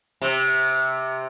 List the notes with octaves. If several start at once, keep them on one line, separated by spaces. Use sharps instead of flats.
C3